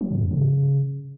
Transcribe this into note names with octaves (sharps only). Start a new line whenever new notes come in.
F#3
G#2
F#2
C#3